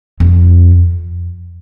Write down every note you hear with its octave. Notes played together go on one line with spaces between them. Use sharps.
F2